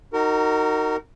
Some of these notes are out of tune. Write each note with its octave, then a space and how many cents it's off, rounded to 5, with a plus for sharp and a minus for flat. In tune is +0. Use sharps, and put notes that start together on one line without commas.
D#4 +0 F#4 +20 A#4 -25